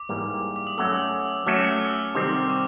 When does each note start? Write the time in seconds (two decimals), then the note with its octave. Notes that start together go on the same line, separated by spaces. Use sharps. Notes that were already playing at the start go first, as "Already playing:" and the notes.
Already playing: D6
0.09 G#2 E3 G3 A#3
0.56 D6
0.67 D#6
0.78 F#3 A3 C#4 F#4 A4 E6
1.46 F#3 A3 C#4 F#4 A4 F6
1.81 E6
2.15 C3 D#3 G3 C4 D6
2.50 C#6